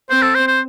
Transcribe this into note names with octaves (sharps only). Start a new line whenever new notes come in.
C4 C5
A4
C5
C5